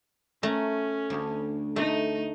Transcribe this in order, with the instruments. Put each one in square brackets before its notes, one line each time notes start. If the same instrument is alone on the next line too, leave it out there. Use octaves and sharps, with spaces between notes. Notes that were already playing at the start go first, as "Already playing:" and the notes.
[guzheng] A3 A5 A#5 [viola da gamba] C#4
[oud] D2
[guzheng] A3 [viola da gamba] D#4